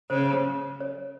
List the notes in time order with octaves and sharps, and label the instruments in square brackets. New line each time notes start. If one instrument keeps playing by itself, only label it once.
[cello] C#3 [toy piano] C5
[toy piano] C#5